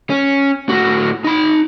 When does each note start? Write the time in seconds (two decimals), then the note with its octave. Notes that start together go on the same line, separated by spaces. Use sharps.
0.10 C#4
0.69 A2 F#4
1.24 D#4 B5